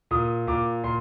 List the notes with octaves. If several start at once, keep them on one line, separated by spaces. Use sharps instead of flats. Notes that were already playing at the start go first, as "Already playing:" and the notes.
A#2 D#6
A#2 D6
A#2 C6